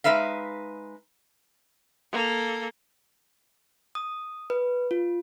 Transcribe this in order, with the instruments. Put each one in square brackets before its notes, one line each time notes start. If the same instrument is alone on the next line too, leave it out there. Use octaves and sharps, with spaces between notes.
[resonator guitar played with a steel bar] G#3 D#4 B4 E5 F5
[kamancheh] A#3 A4
[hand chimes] D#6
B4
F4